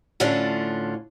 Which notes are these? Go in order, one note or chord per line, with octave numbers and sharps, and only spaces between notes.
A2 D3 F3 C#4 D4 F4